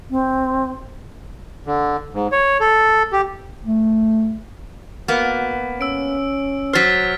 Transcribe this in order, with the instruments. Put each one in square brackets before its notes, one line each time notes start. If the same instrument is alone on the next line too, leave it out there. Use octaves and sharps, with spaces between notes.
[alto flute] C4
[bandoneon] D3
G#2
C#5
A4
G4
[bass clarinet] A3
[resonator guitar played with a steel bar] A#3 B3 [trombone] F#4
[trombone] C#4 [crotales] E6 D7
[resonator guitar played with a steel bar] F#3 C5 [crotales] F6 A6 B6